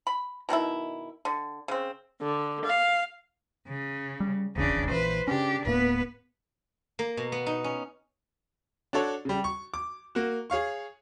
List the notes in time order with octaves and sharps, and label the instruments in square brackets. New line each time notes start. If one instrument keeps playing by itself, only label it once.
[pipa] B5
B2 D#3 B3 E4
D3
C#3 C4
[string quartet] D3
F5
[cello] C#3
[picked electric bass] G3
[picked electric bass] D#1 G#1 E2 [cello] C#3 D4
[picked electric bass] A#1 A#2 E3 [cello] B4 C5
[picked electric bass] C#3 C#4 [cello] D4 G4
[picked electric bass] D1 A2 A#3 [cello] B3 B4
[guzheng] A#3
B2
B3
D#4
C#4
[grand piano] D4 F#4 A4 C#5
C#3 G3
C#6
D6
A#3 F#4
G#4 C#5 F5 C#6